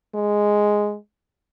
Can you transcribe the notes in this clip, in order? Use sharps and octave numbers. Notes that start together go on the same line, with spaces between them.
G#3